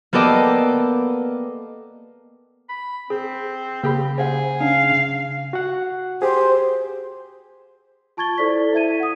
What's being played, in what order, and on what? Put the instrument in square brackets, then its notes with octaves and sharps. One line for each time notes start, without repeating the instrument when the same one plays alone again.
[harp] A#3 B3 G4 A4 D5 D#5
[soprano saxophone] B5
[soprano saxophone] C4 [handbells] G#4
[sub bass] C#3 [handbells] A#3 G#4 B5 [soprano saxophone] G4
[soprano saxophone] G#4 [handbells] C5 F5 F#5
[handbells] C#4 D4 [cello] F5
[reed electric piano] F#4 F#5
[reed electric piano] G4 G#4 [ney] C5
[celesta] F4 A5 C#6 G#6 A6 G7
E4 A4 C5 D5 B6
E4 E5 G#6 D#7
F#5 D#6